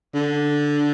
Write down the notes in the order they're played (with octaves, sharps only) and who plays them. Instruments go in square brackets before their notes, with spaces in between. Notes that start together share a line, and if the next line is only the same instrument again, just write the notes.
[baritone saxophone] D3